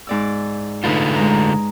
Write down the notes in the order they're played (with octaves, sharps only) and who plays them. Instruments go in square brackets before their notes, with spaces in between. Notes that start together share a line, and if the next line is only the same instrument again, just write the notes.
[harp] G#2 D5 E6
[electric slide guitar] D3 A3 F4 [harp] D#4 B4
[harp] G#3 A#5